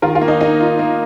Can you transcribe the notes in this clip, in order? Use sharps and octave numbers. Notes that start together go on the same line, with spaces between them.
D#3 F4 A#4
F4
A#3
D#4
A#3 D#4
F4
A#3